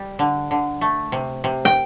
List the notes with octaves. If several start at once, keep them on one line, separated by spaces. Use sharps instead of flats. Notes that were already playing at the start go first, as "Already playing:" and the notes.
Already playing: G3
D3
D3
A3
C3
C3
G5